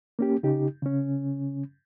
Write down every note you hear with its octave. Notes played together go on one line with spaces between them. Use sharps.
A#3 C#4 G4
C#3 D#4 G4
C#3 C#4